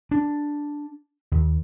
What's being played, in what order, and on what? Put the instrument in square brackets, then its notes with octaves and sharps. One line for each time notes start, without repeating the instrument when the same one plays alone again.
[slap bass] D4
D#2